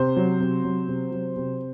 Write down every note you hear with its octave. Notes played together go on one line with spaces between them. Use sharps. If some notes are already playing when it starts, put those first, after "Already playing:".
Already playing: C3 C5
F#3
C3
F#3
C3
F#3
C3